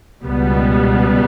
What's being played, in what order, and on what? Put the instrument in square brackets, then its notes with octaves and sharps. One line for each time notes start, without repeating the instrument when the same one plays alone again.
[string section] C#2 B2 G3 B3